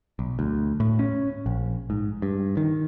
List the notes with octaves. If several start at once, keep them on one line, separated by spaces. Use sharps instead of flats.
B1
D2
A2
C#4
A#1
G#2
G2
D#3